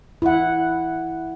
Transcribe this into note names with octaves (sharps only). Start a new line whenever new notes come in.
E4 F#5